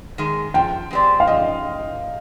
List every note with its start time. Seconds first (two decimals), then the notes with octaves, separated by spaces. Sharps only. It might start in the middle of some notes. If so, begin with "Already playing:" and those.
0.18 D#3 G#3
0.54 F3 G5
0.91 G#3 C4 G4 D5
1.20 F5
1.27 F3 D#5